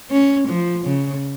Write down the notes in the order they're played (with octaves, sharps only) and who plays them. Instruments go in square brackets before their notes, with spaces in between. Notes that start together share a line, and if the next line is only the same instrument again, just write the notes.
[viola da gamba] C#4
F3
C#3